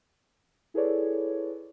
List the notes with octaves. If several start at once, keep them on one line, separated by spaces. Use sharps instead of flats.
E4 G#4 A4 B4 C#5 D5